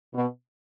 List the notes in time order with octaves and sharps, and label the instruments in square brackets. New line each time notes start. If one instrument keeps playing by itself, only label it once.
[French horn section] B2